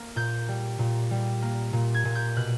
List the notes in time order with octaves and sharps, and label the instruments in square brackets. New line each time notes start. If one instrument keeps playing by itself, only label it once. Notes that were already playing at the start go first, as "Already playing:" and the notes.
Already playing: [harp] A#3
A#2 G6
G3
A#2
G3
A#3
A#2
G#6
A#2
G6
B2 F#6